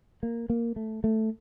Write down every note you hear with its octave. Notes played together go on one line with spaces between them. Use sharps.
A#3
A#3
A3
A3